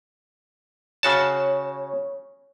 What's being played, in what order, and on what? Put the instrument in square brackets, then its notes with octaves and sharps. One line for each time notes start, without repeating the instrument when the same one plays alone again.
[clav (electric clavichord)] C#3 F#4 A5 [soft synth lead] C#5